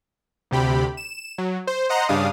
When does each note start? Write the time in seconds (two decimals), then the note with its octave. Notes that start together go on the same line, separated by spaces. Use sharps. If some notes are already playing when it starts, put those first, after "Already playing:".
0.51 D2 C3 G4 B5
0.97 E7
1.38 F#3
1.67 C5
1.89 C5 D#5 F#5 A#5 C6
2.09 G2 C#3 G3 D4 F5 D#6